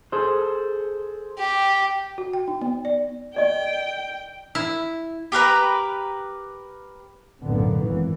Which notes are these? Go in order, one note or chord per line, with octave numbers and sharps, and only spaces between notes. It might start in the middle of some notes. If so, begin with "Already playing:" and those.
G#4 A4 C5
G4
F#4
G5
D#4
B3
D5
D5 D#5 G5
E4
G4 A#4 B4 A#5
B1 F#2 A2 D3 A#3 B3
G#1 E3